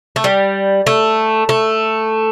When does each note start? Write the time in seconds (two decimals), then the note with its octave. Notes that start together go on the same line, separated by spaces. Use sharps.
0.16 A3
0.24 G3
0.87 A3
1.49 A3